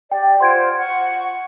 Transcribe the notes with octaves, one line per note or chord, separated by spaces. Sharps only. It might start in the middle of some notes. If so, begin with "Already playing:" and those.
G4 D5 G5
F4 C5 F#5 C6 G#6 D7
F#5 C#6